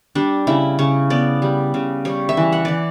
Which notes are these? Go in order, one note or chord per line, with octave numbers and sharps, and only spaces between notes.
G3 D4
C#3 E4
C#3 C#5
B3 D5
G3
C#3
G3 C#5
E5
E3
F#5
E3 D5